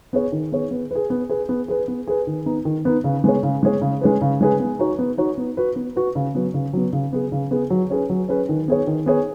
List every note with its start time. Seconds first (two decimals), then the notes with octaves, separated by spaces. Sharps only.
0.13 B3 G#4 C#5
0.32 D#3
0.52 B3 G#4 C#5
0.71 B3
0.91 G#4 B4
1.10 B3
1.29 G#4 B4
1.49 B3
1.68 G#4 B4
1.88 B3
2.07 G#4 B4
2.27 D#3
2.46 B3 D#4
2.65 D#3
2.85 B3 D#4
3.04 C#3
3.24 G#3 B3 G#4 C#5
3.43 C#3
3.63 G#3 B3 G#4 C#5
3.81 C#3
4.01 G#3 C#4 G#4 B4
4.21 C#3
4.41 G#3 C#4 G#4 B4
4.60 B3
4.79 D#4 F#4 C#5
4.99 B3
5.18 D#4 F#4 C#5
5.37 B3
5.57 F#4 B4
5.76 B3
5.96 F#4 B4
6.15 C#3
6.35 F#3 B3
6.54 C#3
6.73 F#3 B3
6.93 C#3
7.13 B3 G#4
7.32 C#3
7.51 B3 G#4
7.70 F#3
7.90 C#4 G#4 B4
8.10 F#3
8.29 C#4 G#4 B4
8.49 D#3
8.68 B3 G#4 C#5
8.87 D#3
9.06 B3 G#4 C#5